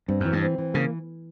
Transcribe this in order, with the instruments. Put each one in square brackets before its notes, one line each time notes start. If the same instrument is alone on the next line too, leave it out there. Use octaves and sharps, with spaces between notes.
[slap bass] G2 [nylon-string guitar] C4
[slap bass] F#2 [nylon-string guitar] E3
[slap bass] G2
[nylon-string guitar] C4
E3
[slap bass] C#3 [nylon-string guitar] A#3